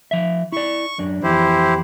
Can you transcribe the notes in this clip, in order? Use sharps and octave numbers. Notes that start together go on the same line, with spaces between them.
F3 E5
E4 D5 C#6
F#2 D4
F2 E3 E4 G4 C5